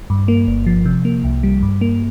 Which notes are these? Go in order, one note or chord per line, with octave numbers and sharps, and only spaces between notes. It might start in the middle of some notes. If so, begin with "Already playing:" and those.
G2
A#3
G1
F3
C3
A#3
C2
G3
G2
A#3